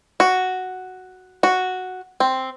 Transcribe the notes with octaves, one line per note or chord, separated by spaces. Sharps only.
F#4
F#4
C4